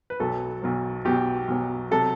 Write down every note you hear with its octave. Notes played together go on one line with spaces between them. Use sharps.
B4
B1 B2 F#3 A4
B1 B2 F#3
B1 B2 F#3 G4
B1 B2 F#3
C3 F#3 A4